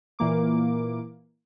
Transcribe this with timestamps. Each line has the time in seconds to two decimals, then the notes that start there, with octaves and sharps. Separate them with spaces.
0.19 A#2 E3 A#3 D6